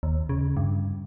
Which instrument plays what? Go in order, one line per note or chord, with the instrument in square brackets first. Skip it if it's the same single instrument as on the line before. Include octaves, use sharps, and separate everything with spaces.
[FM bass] D#2
C#3
G2